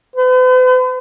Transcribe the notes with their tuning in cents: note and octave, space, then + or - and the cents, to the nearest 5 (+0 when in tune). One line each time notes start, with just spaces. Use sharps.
B4 +45